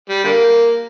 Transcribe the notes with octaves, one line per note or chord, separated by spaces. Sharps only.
G3
D3 G3 A#3